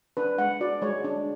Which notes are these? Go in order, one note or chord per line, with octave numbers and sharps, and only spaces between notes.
D4 B4
G#3 F#5
F#4 D5
G#3 C#5
D4